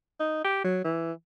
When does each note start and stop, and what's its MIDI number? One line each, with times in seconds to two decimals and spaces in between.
0.20 0.42 63
0.45 0.64 67
0.65 0.80 54
0.84 1.12 52